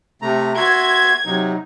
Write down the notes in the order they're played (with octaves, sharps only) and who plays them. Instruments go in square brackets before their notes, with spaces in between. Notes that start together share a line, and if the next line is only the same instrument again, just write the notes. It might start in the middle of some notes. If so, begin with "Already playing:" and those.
[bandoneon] C3 A3 A#5
[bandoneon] F#4 E5 C6 [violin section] G#6
[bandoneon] C3 F#3 D#4